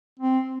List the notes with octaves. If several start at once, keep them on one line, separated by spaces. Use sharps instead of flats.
C4